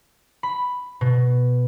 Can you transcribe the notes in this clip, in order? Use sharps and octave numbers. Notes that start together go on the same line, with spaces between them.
B5
B2